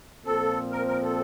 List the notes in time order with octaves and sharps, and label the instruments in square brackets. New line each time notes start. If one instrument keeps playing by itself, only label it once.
[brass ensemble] A#2 F3 C4 [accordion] A4
[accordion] A#4
A#4
A4